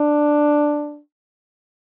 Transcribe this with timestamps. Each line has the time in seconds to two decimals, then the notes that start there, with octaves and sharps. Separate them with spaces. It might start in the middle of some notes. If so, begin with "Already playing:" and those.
Already playing: D4